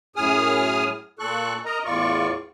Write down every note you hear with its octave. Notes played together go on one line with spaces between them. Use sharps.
F#2 A2 G#4 G#5 D#6 F6
A#2 A4 C#6 F#6
A#4 D#5 A#5
E2 A2 F4 D5 C#6